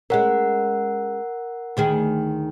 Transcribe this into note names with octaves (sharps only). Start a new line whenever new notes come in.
G#3 C#4 A#4 F#5
D2 D#3 G#4